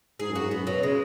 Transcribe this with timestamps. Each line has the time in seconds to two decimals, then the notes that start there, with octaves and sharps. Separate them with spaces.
0.19 G#2 G#4
0.30 F#2
0.35 G#2 F#4
0.51 F#2 B3
0.67 B2 F#3
0.83 C#3 G#3